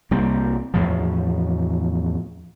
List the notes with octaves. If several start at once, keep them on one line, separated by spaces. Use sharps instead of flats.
C2 G3 A#3 C4
E2 A2 F3